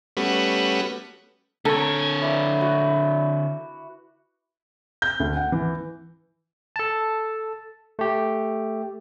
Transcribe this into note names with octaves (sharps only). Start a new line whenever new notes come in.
G3 A3 B3 C#4 F#4 B4
D3 A4 A#4 C#5
E4 B4 D5
F#4
G6
D2
F#5
E3
A4 A5
A3 G4